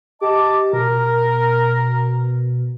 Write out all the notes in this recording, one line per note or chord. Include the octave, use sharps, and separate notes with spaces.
G4 D#5 A5 D6
B2 A#4